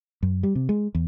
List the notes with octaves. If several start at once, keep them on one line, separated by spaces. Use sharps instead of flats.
F#2
G3
C3
G#3
E2